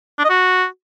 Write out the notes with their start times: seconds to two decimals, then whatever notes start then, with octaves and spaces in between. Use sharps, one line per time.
0.19 D4
0.24 D#5
0.30 F#4